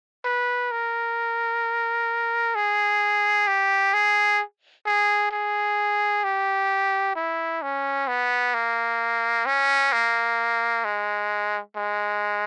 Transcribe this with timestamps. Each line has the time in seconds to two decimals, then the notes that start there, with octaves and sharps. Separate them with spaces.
0.25 B4
0.71 A#4
2.55 G#4
3.47 G4
3.94 G#4
4.86 G#4
5.31 G#4
6.24 G4
7.16 E4
7.62 C#4
8.08 B3
8.54 A#3
9.46 C#4
9.93 A#3
10.85 G#3
11.77 G#3